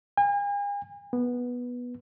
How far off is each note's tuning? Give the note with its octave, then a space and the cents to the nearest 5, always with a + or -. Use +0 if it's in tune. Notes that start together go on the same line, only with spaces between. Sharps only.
G#5 -40
B3 -10